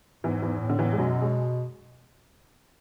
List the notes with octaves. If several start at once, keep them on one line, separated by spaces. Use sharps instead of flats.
E2 G#2 E3
E2 E3
A2
D3
E2 E3
G#3
F#2 B2 F#3
G#3